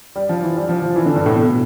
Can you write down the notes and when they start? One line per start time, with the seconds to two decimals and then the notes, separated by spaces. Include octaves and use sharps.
0.16 G3
0.29 F3
0.43 E3
0.56 G3
0.69 F3
0.82 F3
0.96 E3
1.06 D3
1.16 G2
1.26 A2
1.35 B2